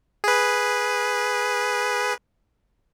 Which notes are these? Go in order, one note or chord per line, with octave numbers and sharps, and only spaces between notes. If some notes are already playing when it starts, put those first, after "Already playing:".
G#4 B4